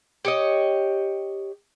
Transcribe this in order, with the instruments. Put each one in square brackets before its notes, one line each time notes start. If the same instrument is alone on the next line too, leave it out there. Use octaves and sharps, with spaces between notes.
[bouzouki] G4 C#5 D#5